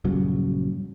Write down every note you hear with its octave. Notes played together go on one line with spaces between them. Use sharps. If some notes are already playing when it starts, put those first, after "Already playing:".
A#1 G2 C#3 F#3